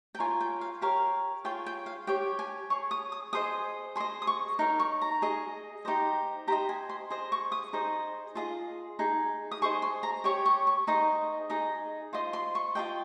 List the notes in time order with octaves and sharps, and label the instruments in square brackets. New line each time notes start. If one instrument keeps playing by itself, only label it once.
[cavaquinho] G5
F4 A#4 C#5 G#5
G5
F5
G4 A#4 C#5 F5
F4 G#4 C#5 G5
G5
F5
G4 C#5 G5
G#5
G#4 C#5 C#6
D#6
D#6
G#4 C5 D#5 D#6
G#4 C5 D#5 C6
D#6
C#6
D#4 A#4 C#5
C#6
A#5
G#4 D#5
D#4 G4 C5 D#5
G4 C5 D#5 A#5
G#5
C6
G#4 C5 D#5
C#6
D#6
D#4 G#4 C5 D#5
F4 G#4 D#5
D#4 G#4
D#6
G#4 C5 D#5 C#6
C6
A#5
G4 C#5 C#6
C#6
C#6
D#4 G#4 C5 D#5
D#4 G#4 D#5
F4 C5 D#5 C6
C6
C#6
F4 G#4 D#5 G5